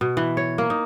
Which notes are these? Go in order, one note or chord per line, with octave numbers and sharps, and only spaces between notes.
B2
E3
C#5
A#3
D#4